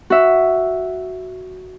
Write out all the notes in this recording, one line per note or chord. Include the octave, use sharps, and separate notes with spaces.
F#4 E5